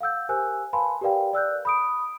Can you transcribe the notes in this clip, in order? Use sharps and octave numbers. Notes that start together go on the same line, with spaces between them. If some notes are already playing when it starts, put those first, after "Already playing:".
F5 F#5 E6 G6
G4 A#4 C5 G#5 E6 F#6
B4 F5 G#5 A5 B5 C6
G4 A#4 B4 D5 F5 G5
D5 E6 F#6 G6
B5 D#6 D7